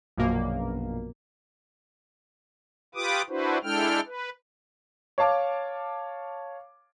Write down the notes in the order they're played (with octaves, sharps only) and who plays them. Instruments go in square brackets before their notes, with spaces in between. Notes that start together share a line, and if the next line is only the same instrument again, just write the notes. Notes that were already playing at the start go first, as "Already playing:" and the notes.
[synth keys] A#1 F#2 B2 A#3
[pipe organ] F4 G4 B4 D6 D#6
D4 E4 F#4 B4 C5
G#3 D4 E4 A4 G5 F6
B4
[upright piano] C#5 F5 A5 D6